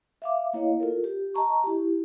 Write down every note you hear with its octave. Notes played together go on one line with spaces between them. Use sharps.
E5 F5 D6
A#3 E4 C#5 D#5 F5
F4 A4 A#4
G4
D#5 A5 A#5 C#6
E4 G4